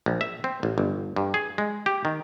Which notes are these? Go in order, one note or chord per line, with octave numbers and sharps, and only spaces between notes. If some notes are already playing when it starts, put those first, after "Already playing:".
A#1
E5
C4
A1
G1
G2
G#4
G#3
G4
D#3